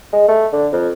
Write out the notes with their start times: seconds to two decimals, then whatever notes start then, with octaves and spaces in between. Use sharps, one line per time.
0.13 G#3
0.28 A3
0.52 D3
0.72 F2